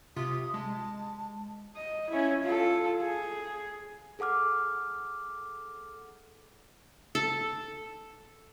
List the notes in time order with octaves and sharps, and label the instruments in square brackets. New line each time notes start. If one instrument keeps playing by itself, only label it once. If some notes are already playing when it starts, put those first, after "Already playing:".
[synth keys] C3 F4 B6 [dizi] D#6
[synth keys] G#3 [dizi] A5
[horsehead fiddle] D#5
C#4 E4
F4 A4
G#4
[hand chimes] G#4 A4 F#5 D6 F6
[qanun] A4